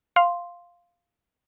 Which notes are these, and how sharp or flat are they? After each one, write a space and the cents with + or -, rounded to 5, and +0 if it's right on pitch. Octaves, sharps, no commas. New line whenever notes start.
F5 +0 C6 +0